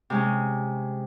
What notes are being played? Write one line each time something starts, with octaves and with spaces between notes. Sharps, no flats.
C3 G#3 C#4